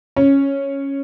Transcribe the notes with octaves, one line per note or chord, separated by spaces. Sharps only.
C#4